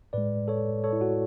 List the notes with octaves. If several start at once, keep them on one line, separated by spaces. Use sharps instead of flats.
A2 G#3 B4 D5
A4 C#5
A4 C#5
E4
F#4